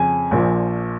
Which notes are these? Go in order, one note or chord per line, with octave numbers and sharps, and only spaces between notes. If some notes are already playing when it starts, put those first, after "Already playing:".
Already playing: F2 C#3 F3 G#5
A#1 A#2 F3